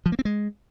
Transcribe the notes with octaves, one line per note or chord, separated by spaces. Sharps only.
F3
A#3
C4
G#3